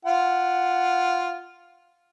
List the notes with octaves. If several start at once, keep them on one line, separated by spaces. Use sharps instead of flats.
F4 F#5